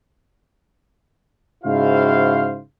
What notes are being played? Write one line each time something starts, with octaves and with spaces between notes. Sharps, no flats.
G#2 C#3 E4 F#4 C5 F5